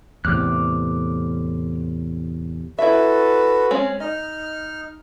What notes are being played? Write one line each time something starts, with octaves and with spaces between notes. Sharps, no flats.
E2 A2 C3 D6 F6 F#6
E4 F#4 A4 B4 E5
G#3 C4 C#4
D#4 D#5 F6